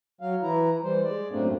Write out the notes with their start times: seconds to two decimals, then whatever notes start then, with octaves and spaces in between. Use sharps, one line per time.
0.21 F#3 F5
0.43 E3 E4 A#5
0.83 E3 G3 C5
1.04 G#3 D5
1.31 F#2 A2 A3 A#3 C4 D4